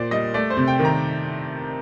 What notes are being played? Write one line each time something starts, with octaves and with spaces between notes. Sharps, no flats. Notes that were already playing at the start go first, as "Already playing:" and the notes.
Already playing: A#2 A#3 C5 D5
G3 D#5
A3 D5
C5
C3
G5
D#3
A#5